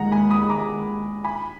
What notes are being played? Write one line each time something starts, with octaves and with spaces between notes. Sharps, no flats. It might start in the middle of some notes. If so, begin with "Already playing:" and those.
Already playing: D#2 D#3 G#3 F#5 A#5
G#5 B5
B5 D#6
A#5 D6
G#5 B5